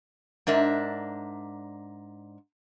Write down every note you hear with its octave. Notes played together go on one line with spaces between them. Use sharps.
G#2 D4 A#4 E5